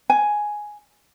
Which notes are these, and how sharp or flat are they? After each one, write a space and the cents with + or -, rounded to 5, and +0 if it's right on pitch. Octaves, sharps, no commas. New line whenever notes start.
G#5 +5